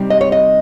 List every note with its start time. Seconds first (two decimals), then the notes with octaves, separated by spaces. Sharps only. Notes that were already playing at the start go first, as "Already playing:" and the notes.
Already playing: C3 G3 C4 D#4
0.10 D#5
0.21 C#5
0.32 D#5